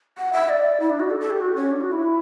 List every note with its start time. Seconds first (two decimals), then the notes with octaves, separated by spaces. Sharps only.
0.18 F#5
0.33 E5
0.49 D5
0.80 E4
0.90 D4
1.00 F#4
1.10 A4
1.20 A4
1.31 G4
1.41 F#4
1.56 C#4
1.71 D4
1.81 F#4
1.92 E4